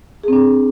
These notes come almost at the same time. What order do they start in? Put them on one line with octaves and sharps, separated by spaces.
G#4 C4 D4